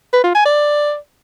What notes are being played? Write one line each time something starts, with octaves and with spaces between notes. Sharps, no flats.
B4
F4
G#5
D5